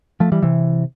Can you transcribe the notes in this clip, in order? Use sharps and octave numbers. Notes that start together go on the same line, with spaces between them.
F3 A3
E3 G3
C3 E3